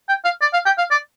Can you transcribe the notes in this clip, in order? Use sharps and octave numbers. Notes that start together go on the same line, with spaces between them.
G5
F5
D5
F5
G5
F5
D5